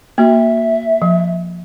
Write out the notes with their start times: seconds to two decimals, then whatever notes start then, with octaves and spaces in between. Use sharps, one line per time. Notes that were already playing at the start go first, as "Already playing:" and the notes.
0.18 A#3 F#4 E5
1.02 F3